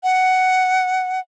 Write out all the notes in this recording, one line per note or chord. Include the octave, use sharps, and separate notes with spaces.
F#5